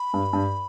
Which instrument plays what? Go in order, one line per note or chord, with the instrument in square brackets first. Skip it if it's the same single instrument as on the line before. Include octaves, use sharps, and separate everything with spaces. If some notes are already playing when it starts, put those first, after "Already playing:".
Already playing: [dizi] B5
[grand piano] G2
G2